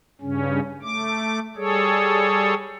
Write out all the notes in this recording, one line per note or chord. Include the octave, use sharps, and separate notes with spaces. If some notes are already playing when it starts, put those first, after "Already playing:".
G2 C#3 C#4
A3 D6
G3 G#4 A4 C#5